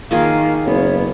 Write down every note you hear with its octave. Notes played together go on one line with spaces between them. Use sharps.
D#3 A#3 F4 G#4 F5
F#1 B3 C#5